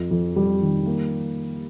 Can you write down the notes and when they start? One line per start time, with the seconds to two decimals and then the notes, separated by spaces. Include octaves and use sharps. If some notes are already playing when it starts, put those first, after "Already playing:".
Already playing: F2
0.11 F2
0.36 G3
0.61 D#3
0.86 A#3